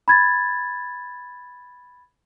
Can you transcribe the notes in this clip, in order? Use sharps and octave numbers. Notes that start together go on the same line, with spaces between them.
B5 G#6 A6